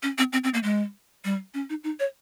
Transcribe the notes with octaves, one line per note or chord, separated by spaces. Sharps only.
C#4
C4
C4
C4
A#3
G#3
G3
C#4
D#4
D#4
C#5